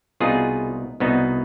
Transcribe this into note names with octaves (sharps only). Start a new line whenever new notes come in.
C2 B2 B3 D#4 F4 G#4
C2 B2 B3 D#4